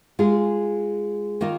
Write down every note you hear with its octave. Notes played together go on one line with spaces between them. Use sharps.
G#3 F4 G#4
D#3 A#3 F4